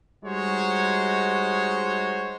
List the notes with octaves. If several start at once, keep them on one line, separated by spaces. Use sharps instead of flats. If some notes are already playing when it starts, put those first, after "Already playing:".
G3 G#3 D#4 F#4 C5 C#5